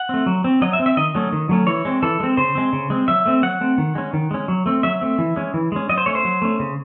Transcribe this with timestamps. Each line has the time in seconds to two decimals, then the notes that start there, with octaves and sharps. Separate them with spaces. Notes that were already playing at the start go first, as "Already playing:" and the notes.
Already playing: F#5
0.09 A3 C4
0.26 F#3
0.44 C4
0.62 F#3 D#5
0.73 E5
0.79 C4
0.86 E5
0.97 D#3 D#5
1.15 F#3 A3 C#4
1.32 D#3
1.49 F#3 A3 C#4
1.67 E3 C#5
1.85 G#3 C4
2.02 E3 A4
2.20 G#3 C4
2.37 C#3 C5
2.55 G#3 C4
2.73 C#3
2.90 G#3 C4
3.08 F#3 E5
3.26 A3 C4
3.43 F#3 F#5
3.61 A3 C4
3.78 D#3
3.95 G#3 C#4
4.13 D#3
4.31 G#3 C#4
4.48 F#3
4.66 A3 C4
4.83 F#3 E5
5.01 A3 C4
5.18 E3
5.36 G#3 C#4
5.54 E3
5.72 G#3 C#4
5.89 F#3 D#5
5.98 C5
6.06 A3 C#4 C#5
6.15 C5
6.25 F#3
6.42 A3 C#4
6.59 C#3